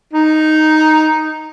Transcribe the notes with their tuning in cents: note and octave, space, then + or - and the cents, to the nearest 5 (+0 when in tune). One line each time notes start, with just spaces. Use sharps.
D#4 +0